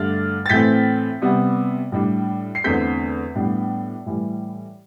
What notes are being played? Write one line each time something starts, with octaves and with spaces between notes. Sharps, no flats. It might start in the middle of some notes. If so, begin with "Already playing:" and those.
Already playing: G2 D3 A3 D4 F6 A6
A6
A2 E3 A3 C4 G6 B6
C3 G3 B3
A2 G3 D4
C7
E2 D3 A3 C4 G6 B6
A2 G3 B3 D4
A2 E3 G3